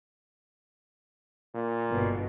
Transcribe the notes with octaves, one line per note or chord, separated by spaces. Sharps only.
A#2
G1 B2